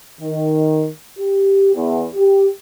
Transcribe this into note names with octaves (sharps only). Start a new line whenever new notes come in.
D#3
G4
E2
G4